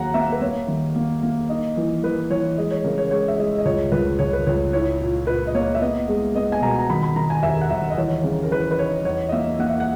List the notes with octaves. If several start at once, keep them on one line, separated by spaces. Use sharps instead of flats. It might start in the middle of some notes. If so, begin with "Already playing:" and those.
Already playing: D#2 F#3 A#3 F#5 A#5
A#3 E5
B4
A#3 C#5
D#3
A#3
A#3
D#4 D#5
E3
E3 B4
E3 C#5
G#3 D#5
C#5
C#3 A#4
C#5
G#3 C#5
E5
G#3 D#5
D#5
C#2 C#5
C#2 B4
C#2 C#5
B4
C#2 C#5
E4 C#5
A#2
A#2 B4
D#5
A#3 C#5
E5
B3 D#5
G#3
B3 D#5
G#5
B2 A#5
A#5
D#3 B5
B5
D#3 A#5
G#5
D#2 E5
F#5
D#2 E5
D#5
E3 C#5
C#3
A#4
E3 B4
B4
D#4 C#5
E2 C#5
D#5
A#3 E5
A#3 F#5
E5
F#5